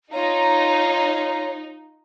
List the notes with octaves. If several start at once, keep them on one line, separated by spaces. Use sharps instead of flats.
D#4 F4 C#5 A#5